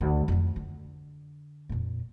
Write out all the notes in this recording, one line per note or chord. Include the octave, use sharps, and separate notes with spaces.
D2
F2 A3
D3
F2 A#2